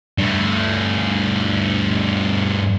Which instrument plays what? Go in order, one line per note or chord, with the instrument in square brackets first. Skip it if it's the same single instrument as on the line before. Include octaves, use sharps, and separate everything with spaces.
[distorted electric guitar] G2 A3